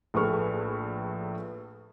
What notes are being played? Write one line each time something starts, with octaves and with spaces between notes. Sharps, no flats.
A#1 A2 G#4 B4 C#6 F6